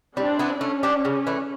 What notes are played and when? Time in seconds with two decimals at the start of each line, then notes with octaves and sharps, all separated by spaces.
0.17 G3 C4 D4
0.39 B3 E4
0.61 A3 C#4
0.83 D4 G4
1.05 C#3
1.27 E3 A3